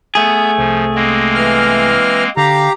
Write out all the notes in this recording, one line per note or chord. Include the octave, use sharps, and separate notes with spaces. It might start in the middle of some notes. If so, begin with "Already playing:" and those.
A3 B3 G#4 G6
C2 F3
G#3 A#3 C4
E3 F6
D3 G4 F5 A#5